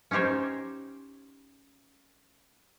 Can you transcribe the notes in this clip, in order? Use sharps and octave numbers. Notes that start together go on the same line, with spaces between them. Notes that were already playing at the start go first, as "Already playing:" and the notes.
C#4 D#4 G4 C5 C#5